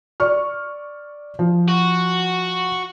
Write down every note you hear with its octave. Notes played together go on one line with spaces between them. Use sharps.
D5 C#6 F6
F3
F#4